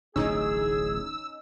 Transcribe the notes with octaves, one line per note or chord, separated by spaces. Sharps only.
D1 A1 G2 C#4 D#4 G#4 E6